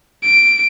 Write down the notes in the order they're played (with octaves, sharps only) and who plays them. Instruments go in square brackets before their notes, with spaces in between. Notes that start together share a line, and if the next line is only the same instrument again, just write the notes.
[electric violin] D7